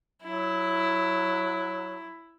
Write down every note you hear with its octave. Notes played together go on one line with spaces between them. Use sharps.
F#3 E4